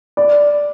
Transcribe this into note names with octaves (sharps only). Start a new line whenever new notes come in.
D5